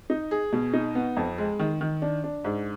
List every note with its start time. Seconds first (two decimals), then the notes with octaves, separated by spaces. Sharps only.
0.10 D#4
0.31 G#4
0.53 B2
0.73 D#4
0.95 B3
1.17 F2
1.38 G#3
1.59 D#3
1.81 D#3
2.02 D4
2.24 D4
2.45 G#2